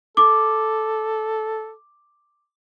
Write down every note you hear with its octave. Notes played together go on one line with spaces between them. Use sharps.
A4 D6